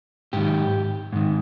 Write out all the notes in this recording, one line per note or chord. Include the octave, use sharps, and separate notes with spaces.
G#2 D#3 G4
G#2 D#3